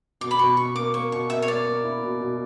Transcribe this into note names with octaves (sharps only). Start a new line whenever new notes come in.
B2 D6
B5
B2 C#6
B2 C#6
A#3 D6
A#3 C#6
B2 C#6
A#3 E5
C#5
A#3 D5
A#3
E4
B2
B2